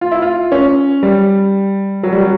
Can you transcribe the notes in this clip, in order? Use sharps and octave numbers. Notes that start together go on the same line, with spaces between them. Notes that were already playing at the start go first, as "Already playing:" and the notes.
F4
E4
F4
C#4
G3
F#3
G3
F#3